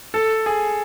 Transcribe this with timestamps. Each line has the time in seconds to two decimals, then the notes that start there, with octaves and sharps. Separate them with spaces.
0.14 A4
0.46 G#4